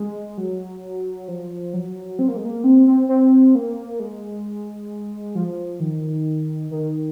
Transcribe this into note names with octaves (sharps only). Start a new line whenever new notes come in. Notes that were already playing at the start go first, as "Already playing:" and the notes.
Already playing: G#3
F#3
F3
F#3
C4
A#3
G#3
A#3
C4
C4
C4
A#3
G#3
F3
D#3
D#3